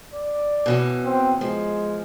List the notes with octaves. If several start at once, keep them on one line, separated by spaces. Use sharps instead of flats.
D5
B2 E3 C#4
C4
F3 G#3